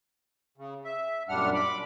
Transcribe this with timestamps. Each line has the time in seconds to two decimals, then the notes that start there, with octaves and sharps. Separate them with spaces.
0.57 C#3
0.85 E5
1.29 F#2 A#2 G3 D4 F#5 F6
1.54 B5 D6